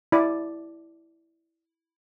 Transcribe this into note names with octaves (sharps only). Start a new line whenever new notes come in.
E4 D5